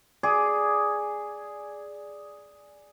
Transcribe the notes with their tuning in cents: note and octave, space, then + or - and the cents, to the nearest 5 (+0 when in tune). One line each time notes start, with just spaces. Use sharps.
G#4 +0 D5 +0